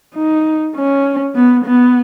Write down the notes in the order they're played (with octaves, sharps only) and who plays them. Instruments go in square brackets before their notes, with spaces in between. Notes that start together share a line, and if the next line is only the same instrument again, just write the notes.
[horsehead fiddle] D#4
C#4
B3
B3